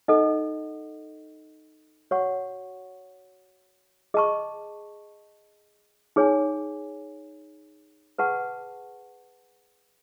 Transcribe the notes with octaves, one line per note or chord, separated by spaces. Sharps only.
D#4 A4 D#5 F#5
F#4 C#5 F#5 C#6
G#4 D#5 A5 C#6
D#4 G#4 C#5 G#5
G#4 B4 F#5 A5 C#6